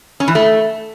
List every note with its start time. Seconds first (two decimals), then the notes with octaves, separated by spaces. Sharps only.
0.20 C#4
0.28 E3
0.35 A3